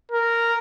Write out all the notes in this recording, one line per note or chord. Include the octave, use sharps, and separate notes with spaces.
A#4